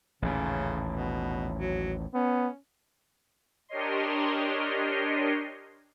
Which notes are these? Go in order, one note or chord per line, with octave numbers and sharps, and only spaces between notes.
A1 D#2 A#2 C#3
B2
F#3
B3 C#4
D4 G4 A#4 C#5 D#5 C6